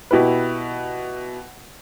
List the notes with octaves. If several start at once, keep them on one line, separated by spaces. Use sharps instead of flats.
B2 E4 G4 B4